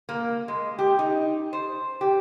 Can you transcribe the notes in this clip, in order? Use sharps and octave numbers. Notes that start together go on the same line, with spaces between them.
A#3
G#3
G4
D#4
C5
G4